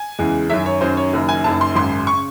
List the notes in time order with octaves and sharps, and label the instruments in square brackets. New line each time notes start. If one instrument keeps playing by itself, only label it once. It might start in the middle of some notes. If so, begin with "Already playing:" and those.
Already playing: [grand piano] G#5
E2 C#3 E3 G#3
F#2 D#3 F#3 C#4 E5
C#5
F#2 D#3 F#3 C#4 C5
C#5
F#1 F#2 D#3
G#5
F#1 F#2 D#3 A5
C6
G#1 F#2 C#3 C6
C#6
C#3